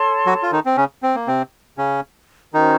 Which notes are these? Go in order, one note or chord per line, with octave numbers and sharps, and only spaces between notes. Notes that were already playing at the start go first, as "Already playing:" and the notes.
Already playing: A4 C#5 A5 C6
F#3 F#4
F4
D#3 D#4
C4
C#3 C#4
C4
A#3
C3 C4
C#3 C#4
D#3 C#4 D#4 F#4 C5